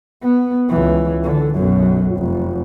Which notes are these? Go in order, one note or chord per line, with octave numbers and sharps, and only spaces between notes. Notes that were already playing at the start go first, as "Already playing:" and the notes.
B3
C#2 E3
D3
B1 F#2
F1